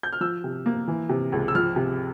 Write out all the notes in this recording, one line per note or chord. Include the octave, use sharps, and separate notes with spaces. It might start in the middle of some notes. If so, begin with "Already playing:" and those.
G6
F6
F3 E6
C3
A#3
E3
C3
C#2
E6
F3 F6
C3